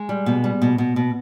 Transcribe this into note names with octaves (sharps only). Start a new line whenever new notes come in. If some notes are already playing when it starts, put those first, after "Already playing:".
Already playing: G#3
G3
B2
G3
B2
B2
B2